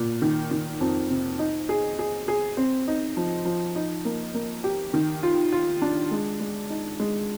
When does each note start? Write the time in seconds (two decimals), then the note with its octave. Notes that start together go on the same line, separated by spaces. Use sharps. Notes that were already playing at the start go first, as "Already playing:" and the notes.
Already playing: A#2
0.22 D#3
0.51 D#3
0.81 F2
1.10 C3
1.39 D#4
1.69 G#4
1.99 G#4
2.28 G#4
2.57 C4
2.88 D#4
3.17 F3
3.45 F3
3.76 D#4
4.05 A#3
4.34 A#3
4.64 G4
4.94 D#3
5.23 F4
5.53 F4
5.82 D4
6.11 G#3
6.41 G#3
6.70 D#4
7.00 G#3